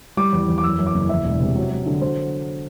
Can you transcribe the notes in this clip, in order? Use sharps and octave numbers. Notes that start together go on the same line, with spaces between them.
G3 D6
E2
E2
D6
F#2 E6
F#2
D6
F#1
E2 E5
E1
C3
F#3
F#3
D3
F#3 C5